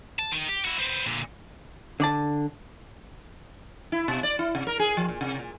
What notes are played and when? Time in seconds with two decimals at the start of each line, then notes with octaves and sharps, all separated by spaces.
0.19 A5
0.31 D#3 D#4
0.48 G4
0.65 E4 F#4
0.79 B3 C4
1.06 A#2 D3
2.00 D3 D5 A5
3.92 E4
4.08 B2
4.23 D5
4.39 E4
4.55 C3
4.67 A#4
4.79 G#4
4.97 F3
5.09 A#2
5.21 C3
5.39 A#2